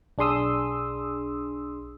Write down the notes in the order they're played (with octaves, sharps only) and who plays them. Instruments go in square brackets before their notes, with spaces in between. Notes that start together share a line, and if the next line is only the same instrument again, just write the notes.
[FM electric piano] B1 D4 G#4 C6 D#6 E6